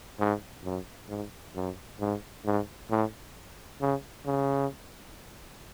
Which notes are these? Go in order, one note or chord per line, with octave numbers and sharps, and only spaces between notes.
G#2
F#2
G#2
F#2
G#2
G#2
A2
C#3
C#3